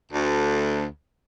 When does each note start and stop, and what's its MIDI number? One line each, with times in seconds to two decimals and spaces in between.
0.12 0.85 38